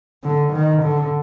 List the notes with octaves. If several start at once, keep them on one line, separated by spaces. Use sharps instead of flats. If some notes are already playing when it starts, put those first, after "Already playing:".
D3
D#3
D3